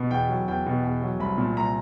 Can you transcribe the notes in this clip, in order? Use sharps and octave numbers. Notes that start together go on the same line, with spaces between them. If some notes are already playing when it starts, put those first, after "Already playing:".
Already playing: B2
E2 G5
F#3
E2 G5
B2
E2
F#3
C2 B5
A#2
C2 A#5